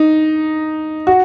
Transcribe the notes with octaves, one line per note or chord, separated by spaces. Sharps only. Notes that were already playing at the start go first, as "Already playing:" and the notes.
Already playing: D#4
F#4